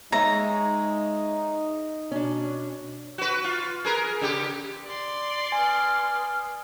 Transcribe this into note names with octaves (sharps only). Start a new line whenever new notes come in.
G#3 D#4 G#4 C#5 E5 A#5
B2 C#4 D4
F#4 B4
F4
G#4 A#4 B4
C#3 B3 G4
D5 C6
B4 G#5 D#6 F6